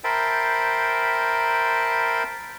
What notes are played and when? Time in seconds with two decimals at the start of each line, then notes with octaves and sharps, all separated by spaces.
0.04 A#4 C5 E5 G5 A5 B5